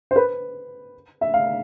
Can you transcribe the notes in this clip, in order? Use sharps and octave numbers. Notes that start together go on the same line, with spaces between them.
C5
B4
E5
F5